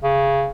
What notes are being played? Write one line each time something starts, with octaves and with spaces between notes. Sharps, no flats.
C#3